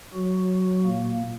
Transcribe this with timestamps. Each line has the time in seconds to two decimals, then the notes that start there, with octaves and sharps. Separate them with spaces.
0.13 F#3 F#4
0.84 A#2 A#3